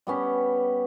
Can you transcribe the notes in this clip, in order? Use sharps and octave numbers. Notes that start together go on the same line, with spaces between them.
G3 B3 C#4 G4